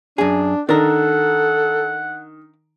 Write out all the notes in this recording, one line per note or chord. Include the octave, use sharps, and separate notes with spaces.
F#2 D4 G#4
D#3 D4 A4 A#4 F#5